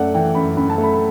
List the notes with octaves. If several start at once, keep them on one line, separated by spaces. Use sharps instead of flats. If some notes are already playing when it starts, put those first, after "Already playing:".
Already playing: F#2 A3 D5 F#5
E3 G5
F#2 B5
F#2 B5
A5
A3
B5
B5